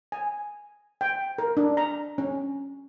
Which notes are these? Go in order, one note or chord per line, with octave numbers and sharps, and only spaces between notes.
G#5
G5
A#4
D4
A#5
C#4